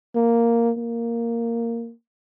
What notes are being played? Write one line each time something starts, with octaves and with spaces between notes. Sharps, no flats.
A#3
A#3